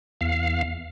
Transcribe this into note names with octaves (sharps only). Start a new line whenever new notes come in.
E2 F5